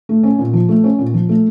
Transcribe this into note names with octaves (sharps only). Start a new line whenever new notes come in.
A3
C#4
A#2
F3
A3
C#4
A#2
F3
A3